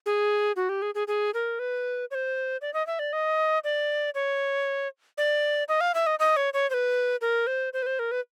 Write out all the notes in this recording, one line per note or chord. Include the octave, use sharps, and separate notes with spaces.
G#4
F#4
G4
G#4
G#4
G#4
A#4
B4
C#5
C5
D5
D#5
E5
D5
D#5
D5
C#5
D5
D#5
F5
E5
D#5
D#5
C#5
C#5
C5
B4
A#4
C5
C5
B4
C5
A#4
B4